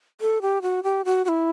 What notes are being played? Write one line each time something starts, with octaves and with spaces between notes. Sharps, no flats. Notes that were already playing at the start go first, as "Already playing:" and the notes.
A4
G4
F#4
G4
F#4
F#4
E4